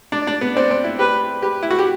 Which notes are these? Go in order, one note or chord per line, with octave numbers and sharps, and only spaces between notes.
D4 D5
D4
B3
C4 D5
C4
E4
G4 B4
G4 B4
E4
F#4
G4